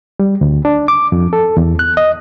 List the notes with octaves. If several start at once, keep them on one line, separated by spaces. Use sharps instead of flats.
G3
D2
D4
D6
F2
A4
E2
F#6
D#5